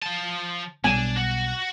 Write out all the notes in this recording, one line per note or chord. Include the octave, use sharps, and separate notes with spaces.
F3 A5
B1 G3 B3 D4 G#5
F#4